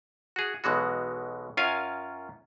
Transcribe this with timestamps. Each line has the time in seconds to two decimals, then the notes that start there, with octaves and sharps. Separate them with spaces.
0.36 F#4 G#4
0.64 B1 B2 E3 G#3 F#4
1.57 F#2 C#4 F4 A#4 F5 G#5